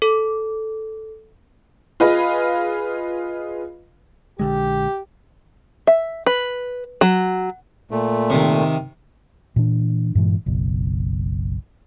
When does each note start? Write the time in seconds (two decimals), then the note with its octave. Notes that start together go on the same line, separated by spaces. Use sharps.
0.02 A4
2.00 F4 G#4 B4 D#5 F5
4.39 A#1 D3 G#3 G4
5.87 E5
6.26 B4
7.01 F#3
7.91 A#2 A3
8.30 C3 D#3
9.56 A#2 E3 D4
10.15 G2 A#2 E3 G#3
10.46 F#1 B1